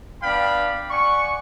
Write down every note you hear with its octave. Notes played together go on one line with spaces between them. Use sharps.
B3 D4 D5 F5 G5 B5
D5 F#5 G#5 C#6